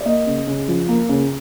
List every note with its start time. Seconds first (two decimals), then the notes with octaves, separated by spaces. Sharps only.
0.01 D5
0.06 A#3 D#5
0.27 C#3
0.47 C#3
0.68 F3
0.89 A#3
1.09 C#3